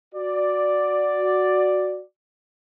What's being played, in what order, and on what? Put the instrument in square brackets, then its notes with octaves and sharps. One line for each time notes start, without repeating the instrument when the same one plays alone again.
[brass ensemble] F#4 D5